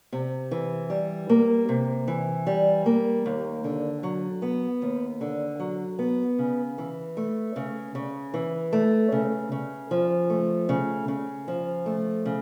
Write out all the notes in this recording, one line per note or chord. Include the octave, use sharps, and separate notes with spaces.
C3
E3
G3
A#3
C3
E3
G3
A#3
D#2
D3
F#3
B3
D#2
D3
F#3
B3
C#3
E3
A3
C#3
C#3
E3
A3
C#3
C#3
F3
A3
C#3
C#3
F3
A3
C#3